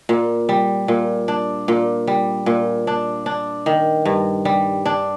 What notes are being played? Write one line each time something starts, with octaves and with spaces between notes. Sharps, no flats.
A#2
G3
A#2
D4
A#2
G3
A#2
D4
D4
D#3
G2
G3
D4